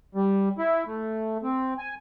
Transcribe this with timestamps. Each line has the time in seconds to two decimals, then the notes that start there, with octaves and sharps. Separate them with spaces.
0.15 G3
0.58 E4
0.86 A3
1.43 C4
1.78 G#5